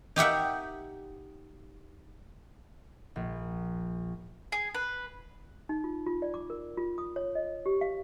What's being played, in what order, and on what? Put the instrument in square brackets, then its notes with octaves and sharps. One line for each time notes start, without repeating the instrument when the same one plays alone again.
[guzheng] D#4 G4 E5 F#5
[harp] A#1
[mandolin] G#4
B4
[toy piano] D#4
F4
F4
D5
D6
A#4
F4
D#6
C#5
D#5
G4
F5